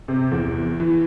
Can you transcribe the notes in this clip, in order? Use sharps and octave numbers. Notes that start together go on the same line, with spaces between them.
C3
E2
E3